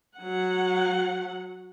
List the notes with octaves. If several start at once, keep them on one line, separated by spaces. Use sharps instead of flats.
F#3 F#5